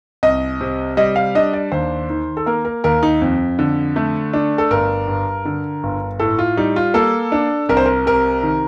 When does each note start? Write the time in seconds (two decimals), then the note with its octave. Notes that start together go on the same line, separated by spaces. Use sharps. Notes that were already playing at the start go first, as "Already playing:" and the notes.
0.23 C2 D#5
0.61 C3
0.97 G3 D#5
1.16 F5
1.35 D4 D#5
1.54 D5
1.72 D#2 C5
2.10 D#3
2.37 A4
2.46 A#3 A#4
2.65 A#4
2.84 D#2 A#4
3.03 D#4
3.22 F2
3.59 D3
3.96 A3
4.33 D4
4.58 A4
4.70 G1 A#4
5.08 G2
5.45 D3
5.83 G1
6.19 A2 A4
6.39 F4
6.57 G3 D#4
6.76 F4
6.94 A#3 A4
7.32 D4
7.69 C2 A#4
7.77 C5
7.86 A#4
8.06 C3 A#4
8.43 D#3